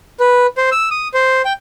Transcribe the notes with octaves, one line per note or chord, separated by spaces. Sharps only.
B4
C5
E6
D#6
C5
G5